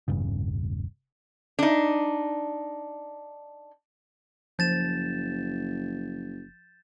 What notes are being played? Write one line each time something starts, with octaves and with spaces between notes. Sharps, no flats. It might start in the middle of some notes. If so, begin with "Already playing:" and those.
E1 A1 G2 C#3
D4 D#4
F#1 F3 G6 A6 E7